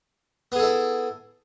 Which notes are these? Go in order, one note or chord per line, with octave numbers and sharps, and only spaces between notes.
B3 E4 G#4 A4